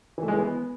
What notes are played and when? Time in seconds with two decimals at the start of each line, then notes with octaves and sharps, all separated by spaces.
0.18 E3
0.23 A3
0.28 G#3
0.33 E3
0.38 B3